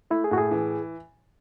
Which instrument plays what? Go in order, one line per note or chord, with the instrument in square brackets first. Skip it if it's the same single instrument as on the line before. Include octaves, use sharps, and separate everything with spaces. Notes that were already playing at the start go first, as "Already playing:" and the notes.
[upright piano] A3 [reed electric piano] E4
[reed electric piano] G#4
[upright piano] A2 [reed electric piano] F#4
[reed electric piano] G#4
[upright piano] E3